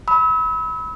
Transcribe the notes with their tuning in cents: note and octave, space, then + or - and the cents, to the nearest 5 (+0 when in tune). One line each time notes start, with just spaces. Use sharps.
B5 +0 E6 -40